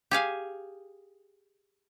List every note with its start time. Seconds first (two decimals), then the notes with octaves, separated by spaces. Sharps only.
0.11 G4 G#4 F5 G#5